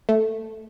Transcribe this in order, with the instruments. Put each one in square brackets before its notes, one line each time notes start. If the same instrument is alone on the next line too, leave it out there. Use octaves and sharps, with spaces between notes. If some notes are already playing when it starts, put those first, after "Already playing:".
[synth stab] A3